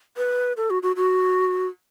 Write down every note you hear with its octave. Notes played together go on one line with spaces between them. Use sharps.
B4
A4
F#4
F#4
F#4